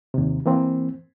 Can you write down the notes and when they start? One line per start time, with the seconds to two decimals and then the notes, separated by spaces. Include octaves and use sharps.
0.14 D#2 C3
0.46 E3 A#3 C4